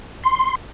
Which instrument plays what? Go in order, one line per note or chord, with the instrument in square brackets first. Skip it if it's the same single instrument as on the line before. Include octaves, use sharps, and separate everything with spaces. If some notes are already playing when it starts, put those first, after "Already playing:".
[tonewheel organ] C6